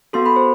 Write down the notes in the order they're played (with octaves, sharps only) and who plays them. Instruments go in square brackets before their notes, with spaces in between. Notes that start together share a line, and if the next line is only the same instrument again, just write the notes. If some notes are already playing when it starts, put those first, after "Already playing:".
[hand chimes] B3 F#4 A4 C6
B5
C5